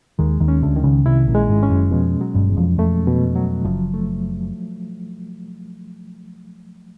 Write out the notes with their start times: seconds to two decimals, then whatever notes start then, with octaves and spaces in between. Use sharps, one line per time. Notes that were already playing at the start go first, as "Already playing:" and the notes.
0.19 D#2 D#3 G#3
0.40 D#2 D#3
0.48 C#4
0.62 D2 D3
0.76 D#3
0.84 C#2 C#3
1.05 C2 C3 E4
1.27 A#1 A#2
1.35 G#3
1.49 G#1 G#2
1.63 C#4
1.70 F#1 F#2
1.91 F2 B2
2.21 F#3
2.34 G1 G2
2.50 E2
2.57 F2
2.78 F2 A3
3.07 B2
3.36 F#3
3.65 F#1 F#2 F3
3.94 A3